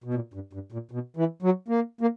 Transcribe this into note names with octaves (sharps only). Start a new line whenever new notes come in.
B2
A#2
G2
G2
A#2
B2
E3
F#3
A#3
A#3